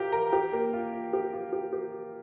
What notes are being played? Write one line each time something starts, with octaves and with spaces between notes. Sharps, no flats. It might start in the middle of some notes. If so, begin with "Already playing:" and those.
Already playing: G4 A#4 F5 G5 A#5
A#4 A#5
G4 G5
A#3 A#4
F4
F4
G4
F4
G4
G4